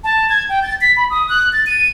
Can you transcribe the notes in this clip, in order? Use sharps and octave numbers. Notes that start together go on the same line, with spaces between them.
A5
G#6
G5
A6
B6
B5
D#6
F#6
A6
D#7